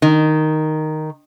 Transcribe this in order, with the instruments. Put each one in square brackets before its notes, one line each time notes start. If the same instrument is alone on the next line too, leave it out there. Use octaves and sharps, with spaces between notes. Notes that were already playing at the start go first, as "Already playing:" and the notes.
[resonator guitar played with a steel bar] D#3